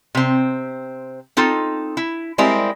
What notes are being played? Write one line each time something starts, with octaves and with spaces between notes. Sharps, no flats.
C3 C4
C4 D#4 F4 A4
E4
G3 G#3 C4 E4 A#4